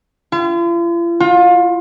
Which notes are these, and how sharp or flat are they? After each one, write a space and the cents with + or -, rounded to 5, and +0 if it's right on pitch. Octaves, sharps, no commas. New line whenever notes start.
F4 -45
F4 +30